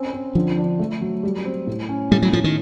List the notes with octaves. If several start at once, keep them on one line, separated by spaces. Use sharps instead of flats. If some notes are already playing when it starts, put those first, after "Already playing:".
Already playing: C4 C#4
C4
D3 F3
D4
A3
F#3
G3
C4
A2
C#4
A2 G3
F#3
A2 F3
D#3